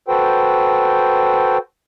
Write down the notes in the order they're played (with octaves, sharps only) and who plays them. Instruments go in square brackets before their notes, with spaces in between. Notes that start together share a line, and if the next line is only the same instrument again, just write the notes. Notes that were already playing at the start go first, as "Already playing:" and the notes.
[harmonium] F#4 A4 B4 C5 G5